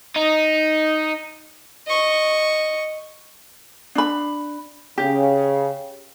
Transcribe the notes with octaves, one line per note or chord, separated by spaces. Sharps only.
D#4
D#5 C#6
D4 B5
C#3 G4